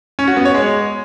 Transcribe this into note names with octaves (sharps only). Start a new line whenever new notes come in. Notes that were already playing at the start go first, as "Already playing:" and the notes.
C#4
F#4
B3
C#5
G#3